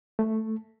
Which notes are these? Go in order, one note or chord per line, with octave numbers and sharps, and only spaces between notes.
A3